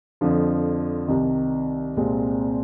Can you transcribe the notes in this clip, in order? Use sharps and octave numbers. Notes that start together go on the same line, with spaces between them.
F2 D3 F3
C2 C3 D#3
C2 A#2 G#3 C4